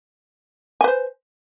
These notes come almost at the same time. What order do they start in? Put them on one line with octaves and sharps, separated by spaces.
G#5 B4 C5